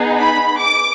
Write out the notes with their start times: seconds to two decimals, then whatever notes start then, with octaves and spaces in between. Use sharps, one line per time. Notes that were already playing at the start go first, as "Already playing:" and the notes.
Already playing: B3 D#4 G#4
0.19 B5
0.61 D6